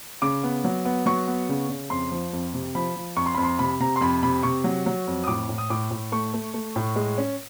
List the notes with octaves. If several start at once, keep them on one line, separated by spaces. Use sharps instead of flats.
C#3 D6
B3
F#3
B3
F#3 C#6
B3
C#3
C#3
F2 C6
F3
F2
C3
F3 B5
F3
F2 C#6
C6
F2 B5
C6
C3 B5
C3 A#5
C6
F2 B5
C3 B5
C3 C#6
F#3
F#3
F2
D#6
A2 D6
A2
D#6
A2 D6
A2
A3 C#6
A3
A3
A2
G#3
C#4